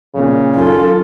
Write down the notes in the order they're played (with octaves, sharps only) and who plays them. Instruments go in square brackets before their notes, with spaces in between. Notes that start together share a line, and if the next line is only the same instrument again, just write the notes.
[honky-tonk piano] A#1 A#2 [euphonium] C#3
[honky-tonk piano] F#2 D#3 G#5 [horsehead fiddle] F4 A4